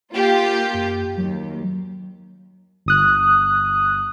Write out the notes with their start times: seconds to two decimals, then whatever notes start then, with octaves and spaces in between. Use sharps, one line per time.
0.12 A#3 F4 G4
0.74 F#2
1.18 D#2 F#3
2.86 G1 D#6 F#6